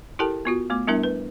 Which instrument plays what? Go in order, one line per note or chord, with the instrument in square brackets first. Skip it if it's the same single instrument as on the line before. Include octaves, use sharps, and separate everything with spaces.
[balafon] E4 G4 A4 A#4 G5 A5
B3 F4 F#4
A3 B3 D6
G3 B3 D4 E4 A#4 E5
B4